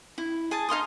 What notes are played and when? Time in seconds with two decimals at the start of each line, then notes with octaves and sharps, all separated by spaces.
0.18 E4
0.51 G#4 G#5 A5
0.69 D#4 F5 C6 D#6